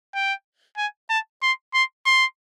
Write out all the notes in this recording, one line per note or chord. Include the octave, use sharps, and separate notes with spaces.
G5
G#5
A5
C6
C6
C6